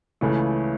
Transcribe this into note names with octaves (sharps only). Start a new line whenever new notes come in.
C#2 C#3 E3 A3